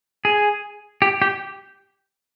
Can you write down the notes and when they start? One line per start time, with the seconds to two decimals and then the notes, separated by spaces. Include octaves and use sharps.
0.25 G#4
1.02 G4
1.22 G4